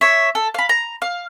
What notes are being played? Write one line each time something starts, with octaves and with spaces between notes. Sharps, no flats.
C#5 E5
A4
F5 B5
A#5
F5